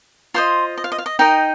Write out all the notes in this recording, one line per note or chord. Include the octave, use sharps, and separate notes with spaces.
F4 C5 D#5 C6
D#5
F5
D#5
F5
D#5
D#4 A#4 D#5 G5